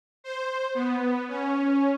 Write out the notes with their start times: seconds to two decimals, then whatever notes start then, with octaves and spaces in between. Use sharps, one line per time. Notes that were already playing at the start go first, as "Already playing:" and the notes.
0.24 C5
0.75 B3
1.28 C#4